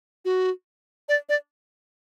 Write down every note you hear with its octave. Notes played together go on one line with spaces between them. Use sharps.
F#4
D5
D5